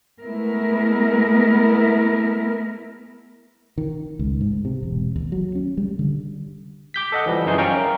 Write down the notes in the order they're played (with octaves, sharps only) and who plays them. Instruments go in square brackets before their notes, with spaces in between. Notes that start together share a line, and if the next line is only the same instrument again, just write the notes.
[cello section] G#3 A3 B3 E4 A#4
[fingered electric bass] D#3
C#2
G#2
C3
E1
D#2
F#3
C#4
G3
D3
[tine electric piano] D6 G6 B6
A4 D#5 F#5
E3 F3 G3
F#2 E3 D#4 G#4 C5 C6
C#4 D5 F5 G5 A#5 C#6
A#4